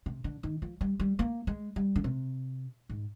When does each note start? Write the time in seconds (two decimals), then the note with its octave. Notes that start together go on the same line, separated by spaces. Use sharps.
0.06 C3
0.24 D3
0.43 D#3
0.62 F3
0.81 G3
1.00 G3
1.19 A#3
1.47 G#3
1.76 G3
1.96 D3
2.04 C3
2.89 G#2